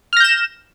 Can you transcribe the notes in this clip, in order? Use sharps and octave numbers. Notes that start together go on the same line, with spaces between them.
F6 G6 A#6 E7